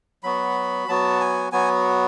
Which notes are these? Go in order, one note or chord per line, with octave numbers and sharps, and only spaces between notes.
F#3 B3 F#4 B5
F#3 B3 F#4 A5
G#5
F#3 B3 F#4 G#5